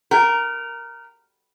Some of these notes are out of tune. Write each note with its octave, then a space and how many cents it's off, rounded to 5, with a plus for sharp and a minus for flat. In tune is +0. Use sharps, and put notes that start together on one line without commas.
A#4 +0 G5 -45